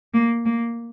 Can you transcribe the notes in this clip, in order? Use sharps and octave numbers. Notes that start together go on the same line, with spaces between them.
A#3
A#3